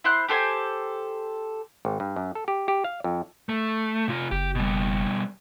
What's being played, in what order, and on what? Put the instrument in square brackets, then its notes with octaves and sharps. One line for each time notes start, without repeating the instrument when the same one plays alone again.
[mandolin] E4 C5 F#6
G4 A4 C5 G#5
[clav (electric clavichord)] G#1
G2
F#2
A4
G4
G4
F5
F2
[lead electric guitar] A3
C3 F4
[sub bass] F#1 [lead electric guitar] G4
[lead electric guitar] B2 G3